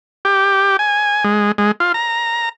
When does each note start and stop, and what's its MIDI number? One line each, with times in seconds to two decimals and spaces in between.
0.25 0.77 67
0.79 1.24 80
1.24 1.52 56
1.58 1.72 56
1.80 1.92 65
1.94 2.49 82